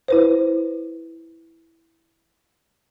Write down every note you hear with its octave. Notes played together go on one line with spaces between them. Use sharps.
E4 B4 C5